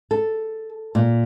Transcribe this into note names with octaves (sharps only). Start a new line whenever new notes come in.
A4
A#2